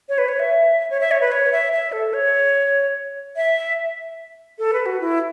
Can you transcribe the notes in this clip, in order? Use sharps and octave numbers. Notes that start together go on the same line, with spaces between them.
C#5
B4
C#5
E5
C#5
E5
C#5
B4
C#5
E5
E5
A4
C#5
E5
A4
B4
F#4
E4